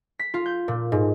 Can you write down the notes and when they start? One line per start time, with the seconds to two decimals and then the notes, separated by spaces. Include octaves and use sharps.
0.19 B6
0.34 F4
0.46 G6
0.68 A#2
0.92 G#2